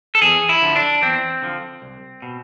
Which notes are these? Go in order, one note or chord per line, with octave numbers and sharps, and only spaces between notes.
A4
E2 G#4
E4
D3 F3
D4
E2 C4
D3 F3
C2
B2